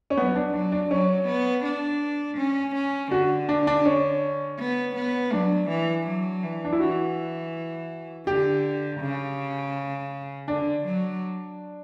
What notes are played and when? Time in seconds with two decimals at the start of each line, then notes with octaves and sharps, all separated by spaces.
0.10 C#4
0.17 F#3 B3
0.35 D4
0.54 F#3 D4
0.72 D4
0.91 F#3 C#4
1.28 B3
1.64 D4
2.38 C#4
2.75 C#4
3.11 D3 F#4
3.49 D4
3.67 D4
3.86 C#4
4.59 B3
4.96 B3
5.32 F#3 D4
5.69 E3
6.07 F#3
6.43 E3
6.65 D4
6.72 E4
6.79 E3 F#4
8.27 D3 G4
9.01 C#3
10.48 D3 D4
10.85 F#3